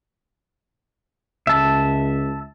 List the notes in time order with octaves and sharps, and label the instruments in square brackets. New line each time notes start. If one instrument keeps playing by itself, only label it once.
[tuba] C#2 [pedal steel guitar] E5 A5